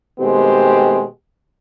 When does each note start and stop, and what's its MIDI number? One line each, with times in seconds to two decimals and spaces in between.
0.20 1.04 47
0.20 1.04 51
0.20 1.04 56
0.20 1.04 57
0.20 1.04 60
0.20 1.04 67